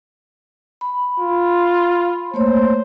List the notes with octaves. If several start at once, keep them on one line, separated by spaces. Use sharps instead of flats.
B5
F4
A3 A#3 C5 C#5